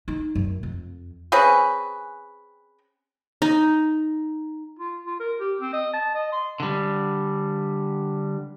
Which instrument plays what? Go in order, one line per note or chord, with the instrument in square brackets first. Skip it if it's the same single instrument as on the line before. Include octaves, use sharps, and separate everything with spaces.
[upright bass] D#4
F#2
F2
[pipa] C4 C#4 G#4 B4
[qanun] D#4
[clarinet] F4
F4
A#4
G4
C4
D#5
A5
D#5
C6
[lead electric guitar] D3 G3